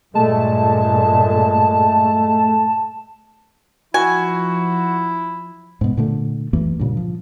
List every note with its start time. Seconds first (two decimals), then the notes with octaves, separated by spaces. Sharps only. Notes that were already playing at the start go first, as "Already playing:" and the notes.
0.15 G2 A#2 G#3 A3 A5
3.94 F3 E4 F#4 G#5
5.81 G#2 B2
5.97 A#2 D3 A3
6.53 F#2 E3 A3 A#3
6.80 G2 A#2 C#3
6.97 F3